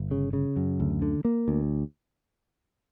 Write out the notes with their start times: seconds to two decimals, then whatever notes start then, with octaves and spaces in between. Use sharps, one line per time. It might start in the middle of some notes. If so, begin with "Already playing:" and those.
Already playing: G1
0.11 C#3
0.33 C#3
0.56 F#2
0.80 D2
1.02 D3
1.25 A#3
1.48 D2